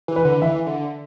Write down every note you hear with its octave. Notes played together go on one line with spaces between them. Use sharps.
E3
B4
D3
E3 E5
D3